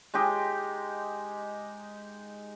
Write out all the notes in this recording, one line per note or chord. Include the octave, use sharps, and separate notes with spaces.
G#3 D#4 G4